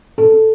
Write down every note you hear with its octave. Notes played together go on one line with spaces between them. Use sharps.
A4